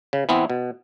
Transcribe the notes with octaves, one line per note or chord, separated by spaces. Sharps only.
C#3
E3 B3 C4 E4
B2